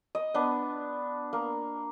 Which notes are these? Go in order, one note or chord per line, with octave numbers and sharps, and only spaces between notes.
D#5
B3 D4
A#3